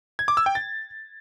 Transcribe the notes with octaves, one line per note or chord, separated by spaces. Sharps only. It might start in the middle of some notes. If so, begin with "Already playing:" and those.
G#6
D6
E6
G5
A6